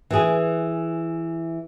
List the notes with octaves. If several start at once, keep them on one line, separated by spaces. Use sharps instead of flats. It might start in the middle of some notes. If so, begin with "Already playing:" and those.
E3 G#4